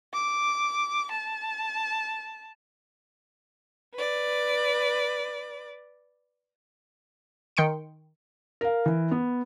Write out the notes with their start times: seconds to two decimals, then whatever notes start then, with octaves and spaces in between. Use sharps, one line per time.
0.14 D6
1.12 A5
3.95 B4 D5
7.57 D#3 G5 C6 C#7 D7
8.61 A#4 F5
8.86 E3
9.11 B3